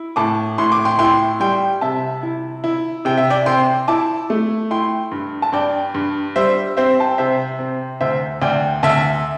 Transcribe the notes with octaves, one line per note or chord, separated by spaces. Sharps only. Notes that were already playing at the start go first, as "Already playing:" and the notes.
Already playing: E4
A2 A5 D6
A2 C6
D6
G5 C6
E4 G5 C6
G3 G5 C6
C3 E5 A5
E4
E4
C3 G5
E5
D5 G5
C4 G5 C6
E4 A5 D6
A3
E4 G5 C6
G2
A5
G2 D5 G5
G2
G3 C5 E5
C4 C5 E5
A5
G5
C3 C5 E5
C4
D2 C5 E5
D2 D5 G5
D2 E5 A5